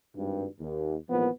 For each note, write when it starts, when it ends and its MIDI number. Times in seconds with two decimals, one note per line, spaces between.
0.15 0.46 32
0.15 0.46 43
0.60 0.95 39
1.08 1.27 32
1.08 1.27 40
1.08 1.27 46
1.08 1.27 53
1.08 1.27 59